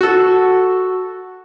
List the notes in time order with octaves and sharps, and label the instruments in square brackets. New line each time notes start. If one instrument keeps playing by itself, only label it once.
[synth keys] F#4 A4